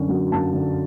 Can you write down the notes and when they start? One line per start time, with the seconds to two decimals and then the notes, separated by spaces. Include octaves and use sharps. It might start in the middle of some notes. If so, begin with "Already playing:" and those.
Already playing: F#2 D3 C#4
0.09 F#3
0.32 F#2 A5
0.54 D3